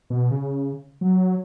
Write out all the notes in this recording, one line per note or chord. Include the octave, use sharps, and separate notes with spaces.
B2
C#3
F#3